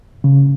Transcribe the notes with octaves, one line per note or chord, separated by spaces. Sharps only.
C#3